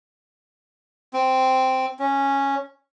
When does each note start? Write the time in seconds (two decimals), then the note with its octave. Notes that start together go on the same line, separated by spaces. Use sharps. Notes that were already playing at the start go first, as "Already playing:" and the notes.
1.13 C4
1.99 C#4